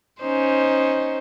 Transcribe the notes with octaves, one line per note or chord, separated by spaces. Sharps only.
C#4 D#4 C5